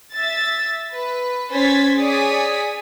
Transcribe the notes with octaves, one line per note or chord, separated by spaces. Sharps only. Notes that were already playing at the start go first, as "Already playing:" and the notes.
E5 A6
B4
C#4 C5 G#6 A6 B6
G#4 C#5 D5 G#5 D#6 B6